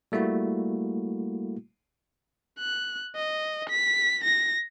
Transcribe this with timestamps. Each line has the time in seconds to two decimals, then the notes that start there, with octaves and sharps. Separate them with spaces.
0.12 G3 A3 A#3 E4 F#4
2.59 F#6
3.16 D#5
3.70 B6
4.25 A#6